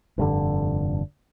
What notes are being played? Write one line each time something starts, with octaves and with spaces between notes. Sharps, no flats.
F1 G2 D3